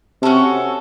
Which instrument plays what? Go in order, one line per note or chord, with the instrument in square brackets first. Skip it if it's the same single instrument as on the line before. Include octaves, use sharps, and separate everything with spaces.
[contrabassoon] C3 [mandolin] C#4 F#4 A4